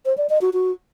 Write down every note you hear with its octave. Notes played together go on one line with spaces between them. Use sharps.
C5
D5
D#5
F#4
F#4